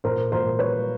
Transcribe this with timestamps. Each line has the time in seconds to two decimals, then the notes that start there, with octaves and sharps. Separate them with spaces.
0.04 A#2 A#4 C5
0.32 A#2 A#4 C5
0.59 G3 B4 C#5